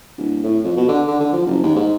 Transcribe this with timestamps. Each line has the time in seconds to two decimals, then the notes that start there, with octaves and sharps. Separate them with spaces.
0.18 D1
0.44 A2
0.64 F2
0.77 B2
0.89 D3
1.07 D3
1.20 D3
1.33 F3
1.46 F#1
1.63 D#2
1.76 G#2